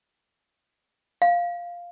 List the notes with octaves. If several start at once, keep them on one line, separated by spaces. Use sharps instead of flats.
F5